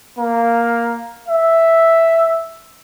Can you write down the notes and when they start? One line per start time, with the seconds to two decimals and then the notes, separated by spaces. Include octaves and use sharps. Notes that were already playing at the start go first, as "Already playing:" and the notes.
0.18 A#3
1.28 E5